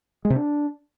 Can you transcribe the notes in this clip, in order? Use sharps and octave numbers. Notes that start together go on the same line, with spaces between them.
G#3
C3
D4